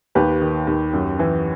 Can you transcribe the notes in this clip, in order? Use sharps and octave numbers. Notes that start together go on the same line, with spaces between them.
D#2 G4 B4
D#3
D#2
F#2
E3